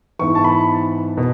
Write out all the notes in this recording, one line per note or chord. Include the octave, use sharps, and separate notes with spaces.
G#2 E3 B3 C#6
A5
B5
B2